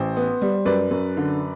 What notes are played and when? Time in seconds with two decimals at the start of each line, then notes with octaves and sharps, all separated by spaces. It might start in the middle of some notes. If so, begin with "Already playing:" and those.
Already playing: A1 C5
0.16 B3
0.42 G3
0.66 F#2 B4 D5
0.91 F#2
1.17 D3